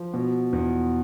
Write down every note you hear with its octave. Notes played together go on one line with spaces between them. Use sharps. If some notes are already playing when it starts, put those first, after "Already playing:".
Already playing: F3
B2
E2